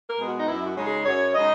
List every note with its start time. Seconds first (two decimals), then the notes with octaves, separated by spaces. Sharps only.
0.09 A#4
0.18 B2 G#3 B3
0.28 F#4
0.38 D#4
0.47 F#2 E4
0.66 F#4
0.77 C#3 G#3 D#4
0.87 G#4
1.05 F#2 C#5
1.34 C#3 G#3 D#4 D#5